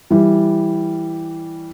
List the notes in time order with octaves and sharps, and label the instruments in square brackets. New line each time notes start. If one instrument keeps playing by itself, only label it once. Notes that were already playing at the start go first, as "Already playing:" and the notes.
[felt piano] E3 G3